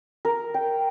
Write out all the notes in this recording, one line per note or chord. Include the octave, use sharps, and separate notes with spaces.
A#4
G5